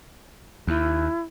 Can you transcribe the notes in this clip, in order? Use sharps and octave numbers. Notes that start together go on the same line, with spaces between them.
D#2 E4